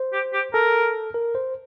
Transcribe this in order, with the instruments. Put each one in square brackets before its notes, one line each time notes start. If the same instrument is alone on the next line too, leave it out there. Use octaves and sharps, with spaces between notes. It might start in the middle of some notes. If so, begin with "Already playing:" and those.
Already playing: [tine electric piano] C5
[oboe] G4
G4
[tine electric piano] A4 [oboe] A#4
[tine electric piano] A#4
C5